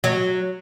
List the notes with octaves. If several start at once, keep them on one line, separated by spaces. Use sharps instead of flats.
F#3